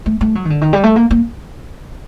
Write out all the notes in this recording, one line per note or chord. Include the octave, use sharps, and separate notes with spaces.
A3
A3
F#3
D#3
D3
D#3
G3
A3
A#3
A#3